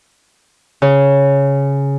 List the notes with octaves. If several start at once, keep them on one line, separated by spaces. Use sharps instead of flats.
C#3